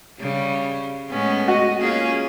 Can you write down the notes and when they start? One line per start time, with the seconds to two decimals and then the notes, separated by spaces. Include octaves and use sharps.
0.19 C#3 G3 C#4
1.10 A2 G#3 B3 C#4
1.48 F#4 D#5
1.81 A#3 C#4 F4 G#4